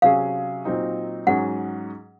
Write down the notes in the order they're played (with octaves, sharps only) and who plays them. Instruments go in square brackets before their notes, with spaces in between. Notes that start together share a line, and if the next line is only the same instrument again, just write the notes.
[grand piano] C3 F#3 C#4 G#4 [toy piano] F5
[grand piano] A#2 F#3 C4 D#4
[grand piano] G#2 F#3 C#4 G#4 [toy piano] F#5